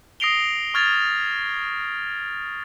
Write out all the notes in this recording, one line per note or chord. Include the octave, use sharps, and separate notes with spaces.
D#6 A#6 C7 D7 F7 G7
C#6 F6 G#6 A6 F7